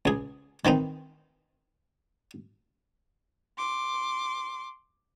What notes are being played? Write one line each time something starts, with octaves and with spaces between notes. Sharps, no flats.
C#2 G#4
D#3 E3 C4 D#4
C6 D6